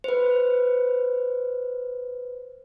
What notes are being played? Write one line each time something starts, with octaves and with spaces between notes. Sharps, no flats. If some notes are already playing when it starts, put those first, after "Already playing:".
B4 C5